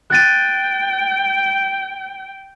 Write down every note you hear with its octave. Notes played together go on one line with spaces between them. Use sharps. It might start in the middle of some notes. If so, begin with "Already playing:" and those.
G5 F#6 A6 D#7